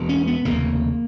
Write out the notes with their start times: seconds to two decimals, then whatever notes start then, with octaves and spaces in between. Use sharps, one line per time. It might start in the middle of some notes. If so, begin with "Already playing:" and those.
Already playing: E1 E2 B2
0.09 C#4
0.27 B3
0.45 F1 D#2 C#3 A#3